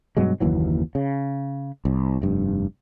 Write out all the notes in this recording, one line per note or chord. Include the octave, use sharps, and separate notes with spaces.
G2 B2 F#3 G#3
F#1 D#2 E3 F#3
C#3
C2
F1 G2